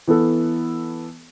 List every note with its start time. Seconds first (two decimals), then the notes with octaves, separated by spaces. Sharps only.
0.08 E3 B3 A4